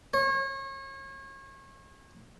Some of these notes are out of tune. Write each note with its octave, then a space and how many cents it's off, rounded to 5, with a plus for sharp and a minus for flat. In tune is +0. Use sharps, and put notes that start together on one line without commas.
C#5 -35